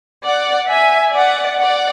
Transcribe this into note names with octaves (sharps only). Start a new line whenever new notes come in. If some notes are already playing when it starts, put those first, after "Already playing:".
D5 F#5
E5 G#5
D5 F#5
D5 F#5